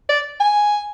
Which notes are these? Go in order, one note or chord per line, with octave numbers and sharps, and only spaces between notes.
D5
G#5